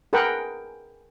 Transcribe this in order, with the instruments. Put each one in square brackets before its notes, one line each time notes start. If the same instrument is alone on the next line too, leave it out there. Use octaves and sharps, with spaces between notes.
[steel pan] G#4 A#4 B4 F#5 G5